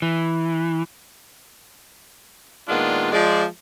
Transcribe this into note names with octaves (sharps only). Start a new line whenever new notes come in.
E3
A#2 D#3 G#3 B3 D4 F4
F3 G#3 D5